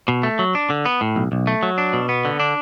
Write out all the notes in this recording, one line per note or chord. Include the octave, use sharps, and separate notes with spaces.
B2
A3
F#3
D4
D3
B3
A2
B1
B1
A3
F#3
D4
B2
B3
D3
D4